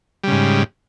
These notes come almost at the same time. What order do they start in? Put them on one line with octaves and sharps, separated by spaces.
G3 C#3 G#2